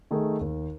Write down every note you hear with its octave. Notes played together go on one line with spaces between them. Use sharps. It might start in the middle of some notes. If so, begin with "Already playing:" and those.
D#3 A3 D#4 G#4
D#2